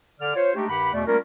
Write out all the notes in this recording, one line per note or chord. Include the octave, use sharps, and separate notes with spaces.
D3 D5 F6
F4 C5 C#5
G#3 A3 D4 D#4 G4
G2 D#3 G4 F#5 B5
E2 B2 A3 D5
G3 A3 A#3 C#4 F4 A#4